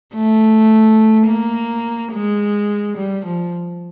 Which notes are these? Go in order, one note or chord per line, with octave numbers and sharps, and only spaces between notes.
A3
A#3
G#3
G3
F3